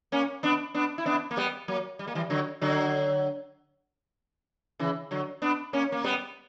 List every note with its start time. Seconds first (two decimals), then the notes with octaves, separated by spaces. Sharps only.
0.12 A#3 C#4
0.43 B3 D4
0.74 B3 D4
0.98 E4
1.06 B3 D4
1.31 A#3
1.37 G3 B3
1.68 F#3 A#3
1.99 G3
2.07 A#3
2.15 E3 G3
2.30 D3 F#3
2.61 D3 F#3
4.79 C#3 E3
5.11 D3 F#3
5.42 B3 D4
5.73 A#3 C#4
5.92 A#3
6.04 G3 B3